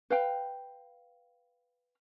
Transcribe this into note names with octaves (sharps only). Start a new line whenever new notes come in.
B4 F5 G5